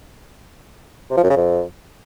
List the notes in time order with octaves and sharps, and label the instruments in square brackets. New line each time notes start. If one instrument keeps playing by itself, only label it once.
[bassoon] C3
F3
F#2
C#3
F2